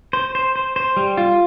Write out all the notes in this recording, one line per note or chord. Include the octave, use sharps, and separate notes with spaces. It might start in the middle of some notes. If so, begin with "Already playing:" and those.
C5
C5
C5
C5
G3
F4